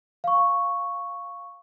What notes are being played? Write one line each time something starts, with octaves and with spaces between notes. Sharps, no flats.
F5 C#6